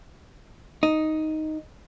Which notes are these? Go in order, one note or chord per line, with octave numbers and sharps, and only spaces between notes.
D#4